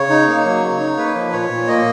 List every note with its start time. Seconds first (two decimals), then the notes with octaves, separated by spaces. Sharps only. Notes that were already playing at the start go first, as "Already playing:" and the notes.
Already playing: C#3 C#5
0.10 D#4
0.27 A#3
0.45 F#3
0.63 C#3
0.80 D#4
0.97 A#3 B4
1.15 F3
1.32 A#2 C#5
1.50 A#2
1.67 A#3 D#5